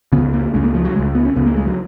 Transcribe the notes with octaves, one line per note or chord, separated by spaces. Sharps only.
C#2 C#3 B3
A#3
C#2 C#3 G#3
A#3
F3
F#3
C#2 C#3 G#3
B3
C#4
C#2 C#3 B3
A#3
G#3
F#3